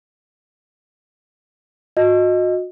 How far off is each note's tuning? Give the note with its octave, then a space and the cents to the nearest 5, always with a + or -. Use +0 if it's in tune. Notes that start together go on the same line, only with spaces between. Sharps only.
F#4 -35 D#5 +0